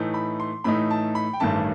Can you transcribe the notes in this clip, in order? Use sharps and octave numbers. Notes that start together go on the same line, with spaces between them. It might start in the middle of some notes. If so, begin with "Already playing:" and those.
Already playing: A2 E3 A3 D#4
B5
C6
A2 E3 A3 D#4 B5
A5
B5
G5
A1 G2 D#3 A3 A5